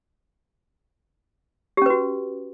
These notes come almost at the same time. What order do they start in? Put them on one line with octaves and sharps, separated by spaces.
G4 C#4 B4 F#4